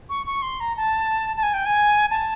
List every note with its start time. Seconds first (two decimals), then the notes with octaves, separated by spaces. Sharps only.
0.09 C#6
0.26 C#6
0.42 C6
0.60 A#5
0.77 A5
1.37 A5
1.43 G#5
1.54 G5
1.66 G#5
2.11 A5